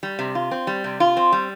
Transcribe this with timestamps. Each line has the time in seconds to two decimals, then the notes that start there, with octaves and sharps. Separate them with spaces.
0.03 G3
0.19 C3
0.35 F4
0.51 C4
0.67 G3
0.84 C3
1.00 F4
1.17 C4
1.32 G3